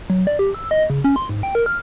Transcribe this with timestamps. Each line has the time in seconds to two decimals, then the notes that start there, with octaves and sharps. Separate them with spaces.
0.10 F#3
0.27 D5
0.39 G4
0.54 E6
0.71 D#5
0.90 C#3
1.04 C#4
1.16 C6
1.29 G#2
1.43 G5
1.55 A#4
1.66 F6